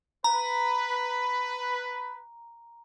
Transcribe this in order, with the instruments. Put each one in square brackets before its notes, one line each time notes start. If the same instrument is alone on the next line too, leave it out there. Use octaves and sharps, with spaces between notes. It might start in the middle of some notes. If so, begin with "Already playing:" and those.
[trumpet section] B4 [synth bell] A#5